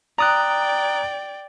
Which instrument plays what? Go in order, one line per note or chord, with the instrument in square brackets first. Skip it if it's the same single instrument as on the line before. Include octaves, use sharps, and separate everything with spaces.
[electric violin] D5 G5 [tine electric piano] A#5 D#6 F#6